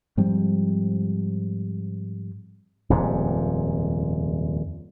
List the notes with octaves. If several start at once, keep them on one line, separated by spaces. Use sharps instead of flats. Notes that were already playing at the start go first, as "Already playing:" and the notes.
G#2 F3 G3 C4
D#1 F2 G#2 C3